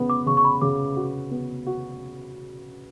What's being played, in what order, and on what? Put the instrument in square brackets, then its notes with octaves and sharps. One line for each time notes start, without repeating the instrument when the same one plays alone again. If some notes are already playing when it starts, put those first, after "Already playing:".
Already playing: [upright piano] C#3 B3
[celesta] D6
[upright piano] C#3 [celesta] C#6
[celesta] C#6
B5
[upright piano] C#3 [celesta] D6
[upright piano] F#4
B3
F#4